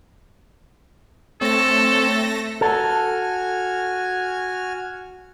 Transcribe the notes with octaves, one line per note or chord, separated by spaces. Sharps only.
A3 C4 A4 C#5 A#6
F#4 A4 G#5 F6